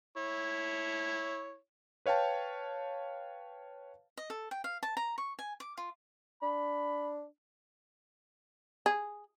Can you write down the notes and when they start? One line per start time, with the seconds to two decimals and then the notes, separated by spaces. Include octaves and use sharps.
0.17 E4 C#5
2.06 B4 C#5 F5 G5 A5
4.17 D#5
4.30 A4
4.51 G5
4.64 F5
4.83 A5
4.97 A#5
5.18 C#6
5.39 G#5
5.60 D6
5.78 F4
6.42 D4 B5
8.86 G#4